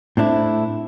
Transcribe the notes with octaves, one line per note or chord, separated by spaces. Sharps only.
A2 C4 D4 E4